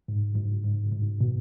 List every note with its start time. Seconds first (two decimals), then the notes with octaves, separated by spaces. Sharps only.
0.08 G#2
0.36 G#2
0.65 G#2
0.92 G#2
1.21 B2